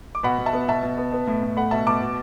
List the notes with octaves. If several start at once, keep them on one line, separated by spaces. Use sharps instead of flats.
D6
B2 F#5 B5
B2
E5 A5
B3
B2 E5 A5
B2
B3
B3
A2
A2
A3 F#5 B5
B2 E5 A5
B2 A5 D6
B2